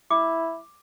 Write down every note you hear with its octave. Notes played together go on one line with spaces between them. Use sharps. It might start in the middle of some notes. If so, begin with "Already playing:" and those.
E4 D6